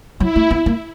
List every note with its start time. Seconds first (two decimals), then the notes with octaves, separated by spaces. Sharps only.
0.20 F#3 E4
0.36 A3
0.51 B3
0.66 A#3